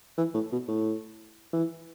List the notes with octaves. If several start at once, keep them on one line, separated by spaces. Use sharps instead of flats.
E3
A2
B2
A2
E3